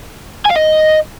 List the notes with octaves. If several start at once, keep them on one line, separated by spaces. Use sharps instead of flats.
G#5
F5
D#5